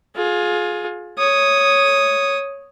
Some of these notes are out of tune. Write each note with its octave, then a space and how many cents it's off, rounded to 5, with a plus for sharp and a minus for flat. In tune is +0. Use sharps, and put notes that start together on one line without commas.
F4 +25 G#4 +20
C#5 +0 D#6 +0